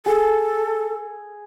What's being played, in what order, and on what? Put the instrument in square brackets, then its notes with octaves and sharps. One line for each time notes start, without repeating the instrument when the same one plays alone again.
[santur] G#4 [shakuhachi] A4